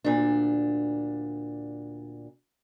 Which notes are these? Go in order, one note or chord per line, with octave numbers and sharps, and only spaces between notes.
D2 A#2 D4